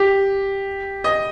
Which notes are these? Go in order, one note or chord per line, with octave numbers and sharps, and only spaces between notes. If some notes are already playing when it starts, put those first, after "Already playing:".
Already playing: G4
D#5